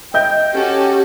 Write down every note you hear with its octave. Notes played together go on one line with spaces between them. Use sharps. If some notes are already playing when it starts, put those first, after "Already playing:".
D#5 G5 G6
C#4 F#4 G4 A4